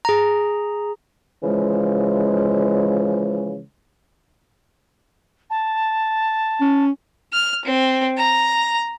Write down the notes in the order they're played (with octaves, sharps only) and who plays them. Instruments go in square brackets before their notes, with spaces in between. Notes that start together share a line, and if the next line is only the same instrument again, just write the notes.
[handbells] G#4 A#5
[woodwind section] C#3 E3 F3 G#3
[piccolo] A5
[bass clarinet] C#4
[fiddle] F6
C4
A#5